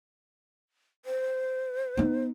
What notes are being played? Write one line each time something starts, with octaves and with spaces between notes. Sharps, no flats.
C5
B3 D#4